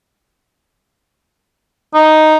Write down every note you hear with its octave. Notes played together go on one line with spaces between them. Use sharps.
D#4